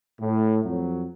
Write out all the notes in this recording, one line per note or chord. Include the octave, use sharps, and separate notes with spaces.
A2
F2 F#3